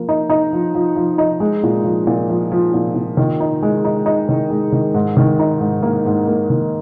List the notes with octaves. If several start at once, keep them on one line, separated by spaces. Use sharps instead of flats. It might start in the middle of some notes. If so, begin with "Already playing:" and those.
Already playing: F3 A#3
D#4
D#4
F3
F3
F3
D#4
G#3
A#2
F3
A#2
F3
F3
A#2
A#2
D#3
D#4
G#3
D#4
D#4
D#3
G#3
D#3
G#2
D#3
D#4
G#2
A#3
G#2
A#3
D#3